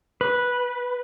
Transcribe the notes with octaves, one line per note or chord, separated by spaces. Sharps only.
B4